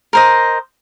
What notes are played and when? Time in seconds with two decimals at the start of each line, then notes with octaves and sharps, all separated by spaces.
0.13 A#4 C5 D#5